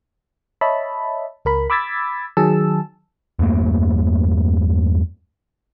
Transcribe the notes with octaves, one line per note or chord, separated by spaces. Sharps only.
C#5 D#5 E5 A5 B5
C#2 A#4 B5
B5 D6 E6 G#6 A6 B6
D#3 F#3 G#4 A5 E6
E2 G2 A3 A#3